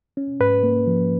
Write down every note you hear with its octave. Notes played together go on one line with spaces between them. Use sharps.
C#4
G#2 B4
A#3
F3